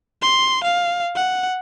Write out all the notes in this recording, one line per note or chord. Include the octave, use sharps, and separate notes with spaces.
C6
F5
F#5